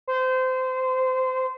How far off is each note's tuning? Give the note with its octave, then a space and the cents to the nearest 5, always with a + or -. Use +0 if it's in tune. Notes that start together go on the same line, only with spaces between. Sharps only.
C5 -25